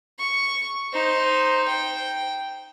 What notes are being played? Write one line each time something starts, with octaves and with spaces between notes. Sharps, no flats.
C#6
D#4 C5
G5